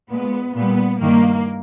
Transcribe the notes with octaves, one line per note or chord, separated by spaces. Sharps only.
A#2 G#3 B3
A#2 G3 B3
G2 D#3 G3 A#3